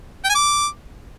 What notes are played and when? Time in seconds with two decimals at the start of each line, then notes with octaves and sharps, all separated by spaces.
0.24 G5
0.30 G#5
0.35 D6